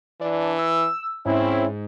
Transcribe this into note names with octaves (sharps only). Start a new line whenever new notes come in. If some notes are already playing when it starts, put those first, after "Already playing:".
E3 D4
E6
G#2 C4 C#4 E4